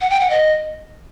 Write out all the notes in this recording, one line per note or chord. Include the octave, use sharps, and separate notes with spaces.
F#5
G5
F#5
D#5